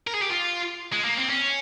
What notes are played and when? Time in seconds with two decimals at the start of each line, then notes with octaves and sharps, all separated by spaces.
0.07 A#4
0.15 G#4
0.22 G4
0.30 F4
0.93 G#3
1.05 A#3
1.17 C4
1.30 C#4